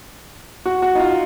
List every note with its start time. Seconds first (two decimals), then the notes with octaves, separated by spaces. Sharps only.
0.66 F#4
0.82 F#4
0.95 D#4
1.00 F4